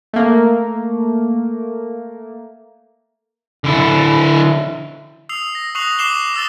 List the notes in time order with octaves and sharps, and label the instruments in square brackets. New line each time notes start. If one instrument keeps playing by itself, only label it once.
[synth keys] A3 A#3
[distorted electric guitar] D3 E4
[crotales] D#6 E6 C7 F7
A#6
C#6 D#6 F#6 C7 F7 F#7
D6 C7 E7 F#7 G7
D#6 E6 A6 G7